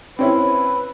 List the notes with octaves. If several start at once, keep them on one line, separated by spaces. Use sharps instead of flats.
C4 C#4 E4 B4